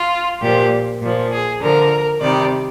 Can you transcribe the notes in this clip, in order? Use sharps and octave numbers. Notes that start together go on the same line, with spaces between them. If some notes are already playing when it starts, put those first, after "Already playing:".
Already playing: F4
A#2 F3 G4
A#2 F3
G#4
D3 F3 A#4
C3 D#3 G3 D5